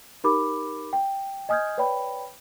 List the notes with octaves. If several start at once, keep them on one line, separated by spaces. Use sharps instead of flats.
D#4 G4 A#4 B5 D6
G5
D#5 G#5 D#6 F6 G6 G#6
B4 C#5 D5 G5 B5